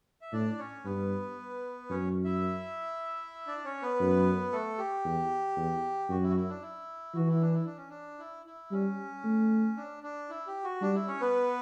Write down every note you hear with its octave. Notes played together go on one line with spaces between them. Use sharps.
E5
A2 D4 D5
C#4 C#5
G2 B3 B4
F#2 C#4 C#5
E4 E5
D4 D5
C#4 C#5
B3 B4
F#2
A3 A4
G4
E2
E2
F#2 F#4
E4
F#4
E4
D4
E4
E3 F#4
E4
D4
E4
D4
C#4
D4
E4
E4
G3 C#4
A3
D4
D4
E4
G4
F#4
G3 D4
E4
C#4 C#5
B3 B4